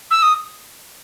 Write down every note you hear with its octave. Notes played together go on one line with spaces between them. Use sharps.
E6
D#6